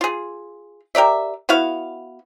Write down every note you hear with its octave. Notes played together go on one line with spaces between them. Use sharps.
F4 G#4
G4 A#4 D5 E5
B3 E4 F#4 F5